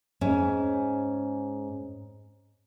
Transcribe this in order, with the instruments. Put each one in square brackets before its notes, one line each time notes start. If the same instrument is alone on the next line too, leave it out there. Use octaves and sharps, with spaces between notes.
[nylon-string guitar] G#2 C#4